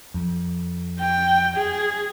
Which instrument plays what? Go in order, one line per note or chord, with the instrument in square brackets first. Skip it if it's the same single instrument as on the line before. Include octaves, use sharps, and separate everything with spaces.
[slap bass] F2
[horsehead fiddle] G5
G#4